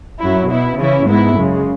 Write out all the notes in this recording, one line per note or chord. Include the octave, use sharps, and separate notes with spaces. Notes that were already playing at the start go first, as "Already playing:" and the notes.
F#2 F#3 E4
B2 B3 E4
C#3 E3 C#4 E4
G#2 G#3 B3 E4
F#2 C#3 G#3